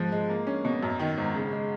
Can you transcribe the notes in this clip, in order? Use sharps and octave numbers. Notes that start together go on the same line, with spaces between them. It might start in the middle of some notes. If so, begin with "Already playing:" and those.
Already playing: G#2 F3
G#3
A#3
C#4
B2
F#2
D#3
G#1
C#3
G#3